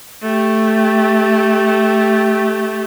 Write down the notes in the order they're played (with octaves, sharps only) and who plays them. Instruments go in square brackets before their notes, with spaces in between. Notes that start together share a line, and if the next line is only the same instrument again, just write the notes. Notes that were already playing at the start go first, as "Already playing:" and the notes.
[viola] A3 G4